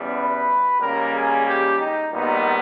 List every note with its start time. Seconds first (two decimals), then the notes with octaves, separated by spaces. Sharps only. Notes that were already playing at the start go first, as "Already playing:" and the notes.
Already playing: E2 C#3 G3 B3
0.12 B4
0.77 C#2 C#3 G3 A#3 A#4
1.12 G#4
1.44 G4
1.77 D#4
2.10 A#1 A#2 G3 B3 D#4